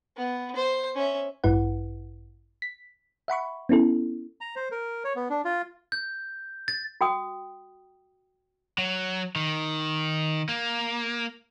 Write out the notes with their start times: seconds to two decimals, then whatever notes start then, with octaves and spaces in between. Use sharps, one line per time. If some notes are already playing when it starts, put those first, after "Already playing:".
0.17 B3
0.55 C5
0.95 C#4 E5
1.44 A1 G2 E4 B4 F#5
2.62 B6
3.28 E5 F#5 B5 C#6
3.69 B3 C#4 E4 A4
4.41 A#5
4.56 C5
4.71 A#4
5.04 C#5
5.16 B3
5.30 D4
5.45 F4
5.92 G6
6.68 A6
7.01 F#4 G5 D#6
8.78 F#3
9.36 D#3
10.49 A#3